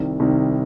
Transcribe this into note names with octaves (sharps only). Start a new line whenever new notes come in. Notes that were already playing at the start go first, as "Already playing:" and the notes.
Already playing: C2 C3 D#3
C2 C3 D#3